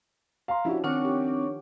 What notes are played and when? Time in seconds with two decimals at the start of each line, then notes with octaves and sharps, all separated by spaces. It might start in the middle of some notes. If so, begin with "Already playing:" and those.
0.48 F5 A#5 C6
0.65 F3 C#4 D4 E4 F#4 G4
0.84 D#3 C4 D4 C#5 F#5 C#6 F6
1.05 G4